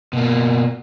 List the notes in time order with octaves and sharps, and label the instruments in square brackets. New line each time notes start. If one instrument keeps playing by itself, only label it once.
[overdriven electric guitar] B2 A#3